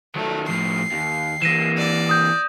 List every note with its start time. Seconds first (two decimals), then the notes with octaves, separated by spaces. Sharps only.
0.15 D#3 F#3 A3
0.49 A2 F3 C7
0.91 D#2
1.42 E3 A#3 A#6 D#7 E7
1.77 D5
2.09 D#6 G6